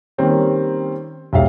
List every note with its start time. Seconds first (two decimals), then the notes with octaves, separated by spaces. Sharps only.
0.18 D#3 G3 A#3 C4 C#4
1.32 E1 B1 G#2 G4 E5 F5